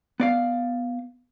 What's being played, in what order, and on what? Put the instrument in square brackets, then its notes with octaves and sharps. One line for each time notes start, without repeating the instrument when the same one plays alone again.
[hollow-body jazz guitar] B3 D5 F5